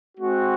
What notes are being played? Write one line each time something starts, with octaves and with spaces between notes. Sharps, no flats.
G#3 C4 F#4